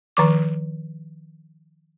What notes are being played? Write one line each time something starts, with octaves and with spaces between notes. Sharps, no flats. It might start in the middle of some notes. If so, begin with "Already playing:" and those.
D#3 F3 D6